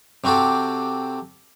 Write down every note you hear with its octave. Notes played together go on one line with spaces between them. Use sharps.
C3 C4 F#4 G4 A4